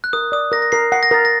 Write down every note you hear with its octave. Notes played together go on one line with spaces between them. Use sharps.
F#6
A#4 D#6
D5 D#6
A#4 A#6
A#6
A#4 C7
F#5 C7
A#6
A#4 A6
A#6